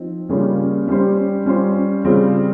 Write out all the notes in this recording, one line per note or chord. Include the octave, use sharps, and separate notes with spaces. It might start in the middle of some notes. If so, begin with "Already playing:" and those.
Already playing: F3 C4 D#4
C#3 G3 A#3 C#4 F4
G3 C#4 G4 C5
G3 C#4 F4 C5
C#3 G3 C4 F4 G#4